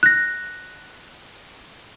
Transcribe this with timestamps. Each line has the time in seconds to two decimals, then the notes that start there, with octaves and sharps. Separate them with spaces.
0.03 F#6 A#6